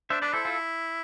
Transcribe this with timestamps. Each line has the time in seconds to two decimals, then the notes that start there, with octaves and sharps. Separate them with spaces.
0.10 D4 C5 E5
0.21 D4 B4 D5
0.33 E4 A4 C5
0.45 F4 A4